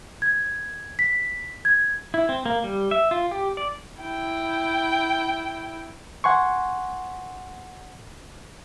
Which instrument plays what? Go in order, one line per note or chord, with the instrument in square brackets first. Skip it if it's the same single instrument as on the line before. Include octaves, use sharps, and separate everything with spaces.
[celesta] G#6
B6
G#6
[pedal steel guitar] E4
C4
A#3
G3
E5
F4
G4
D5
[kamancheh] E4 G5
[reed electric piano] F#5 G#5 C6 C#6